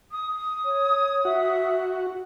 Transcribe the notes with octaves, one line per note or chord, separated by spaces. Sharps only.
D#6
C#5
F#4 E5